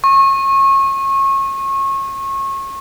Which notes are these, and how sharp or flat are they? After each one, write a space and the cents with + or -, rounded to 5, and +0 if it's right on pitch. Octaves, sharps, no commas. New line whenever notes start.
C#6 -30